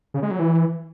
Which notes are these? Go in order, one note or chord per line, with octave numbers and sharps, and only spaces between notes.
C#3
G#3
F#3
E3